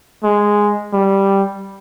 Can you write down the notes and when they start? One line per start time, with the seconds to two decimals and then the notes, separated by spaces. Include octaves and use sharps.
0.23 G#3
0.93 G3